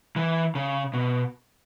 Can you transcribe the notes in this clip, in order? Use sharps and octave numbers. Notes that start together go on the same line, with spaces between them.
E3
C#3
B2